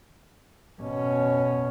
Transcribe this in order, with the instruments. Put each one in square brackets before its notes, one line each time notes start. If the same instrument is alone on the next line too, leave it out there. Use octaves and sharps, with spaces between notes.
[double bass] B2 C#4